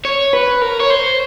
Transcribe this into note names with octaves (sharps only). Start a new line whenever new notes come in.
C#5
B4
A#4
C#5
C5